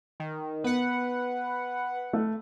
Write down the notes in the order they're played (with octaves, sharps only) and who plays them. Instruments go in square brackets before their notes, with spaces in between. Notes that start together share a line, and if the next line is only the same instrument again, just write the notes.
[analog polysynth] D#3
[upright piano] B3 [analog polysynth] B4 F#5
[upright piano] A3